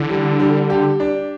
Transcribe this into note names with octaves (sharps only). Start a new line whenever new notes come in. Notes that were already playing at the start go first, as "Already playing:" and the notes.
Already playing: D3 E3
G3
G3
G4
D4